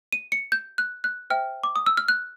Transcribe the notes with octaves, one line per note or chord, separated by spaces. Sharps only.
D#7
C#7
G6
F#6
F#6
C5 E5 G5 F6
D6
D#6
E6
F6
F#6